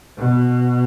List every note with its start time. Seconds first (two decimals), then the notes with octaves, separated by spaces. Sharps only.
0.18 B2